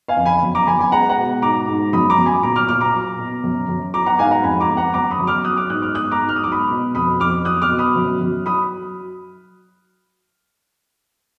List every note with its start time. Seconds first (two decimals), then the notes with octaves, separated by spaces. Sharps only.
0.08 F5 G#5
0.17 F2
0.26 G#5 B5
0.43 F#2
0.55 A#5 D6
0.67 F#2 G#5 B5
0.79 G#5 B5
0.92 G#3 F#5 A#5
1.09 F#5 A#5
1.18 B2
1.42 G#2 A#5 D6
1.68 G#2
1.93 F#2 B5 D#6
2.10 A#5 D6
2.18 F#2
2.26 G#5 B5
2.43 A#2 A#5 D6
2.56 D6 F6
2.69 A#2 D6 F6
2.81 A#5 D6
2.93 F#3
3.19 B2
3.44 F#2
3.68 F#2
3.94 F#3 A#5 D6
4.06 F#5 A#5
4.19 G#2 F5 G#5
4.31 F#5 A#5
4.44 F2 G#5 B5
4.60 A#5 D6
4.70 F2
4.77 F#5 A#5
4.94 F#2 A#5 D6
5.11 B5 D#6
5.19 F#2
5.27 D6 F6
5.44 F#3 D#6 F#6
5.57 D6 F6
5.70 G#2 D#6 F#6
5.82 D6 F6
5.94 F#3 D#6 F#6
6.11 A#5 D6
6.20 G#2
6.29 F6
6.36 D#6
6.44 F#3 D6
6.52 B5 D#6
6.71 B2
6.95 F2 B5 D#6
7.20 F2 D6 F6
7.45 F#3 D#6 F#6
7.62 D6 F6
7.71 B2
7.79 B5 D#6
7.96 F#2
8.21 F#2
8.46 F#3 B5 D#6